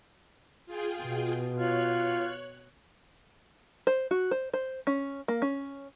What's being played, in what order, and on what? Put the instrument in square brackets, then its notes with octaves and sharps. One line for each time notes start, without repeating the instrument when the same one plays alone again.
[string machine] F4 G#4 G5
[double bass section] B2
[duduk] F4 [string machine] C#5 F#6
[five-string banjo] C5
F#4
C5
C5
C#4
A#3
C#4